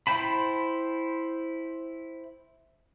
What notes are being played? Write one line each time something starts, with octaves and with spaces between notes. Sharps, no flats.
E4 C5 G5 A5 B5